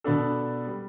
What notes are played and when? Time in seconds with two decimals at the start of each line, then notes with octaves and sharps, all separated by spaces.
0.04 B2 B3 D4 A4
0.67 G3